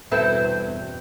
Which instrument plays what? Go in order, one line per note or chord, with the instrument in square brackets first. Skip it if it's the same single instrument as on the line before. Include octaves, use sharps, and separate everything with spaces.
[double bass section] E2 G2 B2 [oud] C4 E4 A4 [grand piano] B4